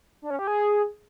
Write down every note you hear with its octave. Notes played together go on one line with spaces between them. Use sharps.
D4
C#4
G4
G#4